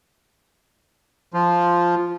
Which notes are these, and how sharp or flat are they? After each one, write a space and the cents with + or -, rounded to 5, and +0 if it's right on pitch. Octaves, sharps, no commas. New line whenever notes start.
F3 +0 F4 -5